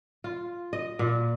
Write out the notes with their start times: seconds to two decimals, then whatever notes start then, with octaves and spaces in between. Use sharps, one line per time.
0.24 F4
0.73 D#5
0.99 A#2